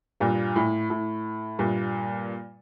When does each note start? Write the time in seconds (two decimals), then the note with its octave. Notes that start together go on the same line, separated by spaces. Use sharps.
0.20 G2 A#2
0.56 A2
0.90 A2
1.59 G2 A#2